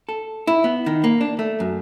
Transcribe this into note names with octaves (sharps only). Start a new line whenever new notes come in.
A4
E4
B3
D#3
A#3
D4
A3
F#2